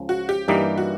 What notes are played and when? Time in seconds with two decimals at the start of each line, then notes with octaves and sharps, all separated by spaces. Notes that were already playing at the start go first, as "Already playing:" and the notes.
Already playing: C#2 C#3 F3
0.09 F#4
0.29 G4
0.48 G2 E3 G3 A#3 D#4 G4
0.78 F#4